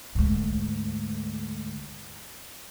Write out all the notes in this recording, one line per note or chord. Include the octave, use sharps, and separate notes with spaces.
D2 G#2